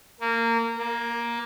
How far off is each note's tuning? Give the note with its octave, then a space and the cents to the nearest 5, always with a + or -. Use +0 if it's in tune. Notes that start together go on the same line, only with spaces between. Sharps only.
A#3 -20
A#3 +15